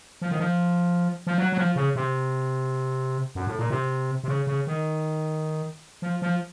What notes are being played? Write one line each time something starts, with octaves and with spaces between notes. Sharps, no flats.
F3
D#3
F3
F3
F#3
F#3
F3
C#3
C3
F#2
A2
A#2
C3
C3
C#3
C#3
D#3
F3
F3